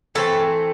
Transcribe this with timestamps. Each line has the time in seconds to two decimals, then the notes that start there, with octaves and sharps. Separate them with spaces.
0.15 E3 A3 C4 A4